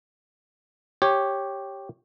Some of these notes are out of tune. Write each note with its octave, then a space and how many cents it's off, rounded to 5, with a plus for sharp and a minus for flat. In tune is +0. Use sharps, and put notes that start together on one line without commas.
G4 +0 C#5 -15